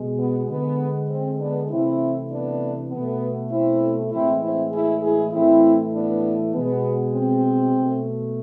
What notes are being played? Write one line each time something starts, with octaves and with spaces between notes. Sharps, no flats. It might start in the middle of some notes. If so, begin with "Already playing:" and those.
Already playing: B2 G#3
B3
D3 G#3 B3
C4
B3 D4
C3 E3 A3 C4 E4
B3 D4
B2 A3 B3
C4 E4
A2 E3 G#3 C4 E4
C4 E4
E4 G#4
E4 G#4
A2 E3 A3 C4 E4
B3 D4
B2 G#3 B3
C4
B2 A3